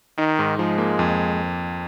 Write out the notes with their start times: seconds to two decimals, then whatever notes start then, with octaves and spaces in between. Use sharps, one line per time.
0.18 D#3 D#4
0.39 G#2
0.58 F3 G#3
0.78 A#3
0.99 F2